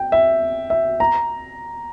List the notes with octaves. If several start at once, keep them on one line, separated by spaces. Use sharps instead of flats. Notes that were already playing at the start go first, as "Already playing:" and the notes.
Already playing: G5
E5
E5
A#5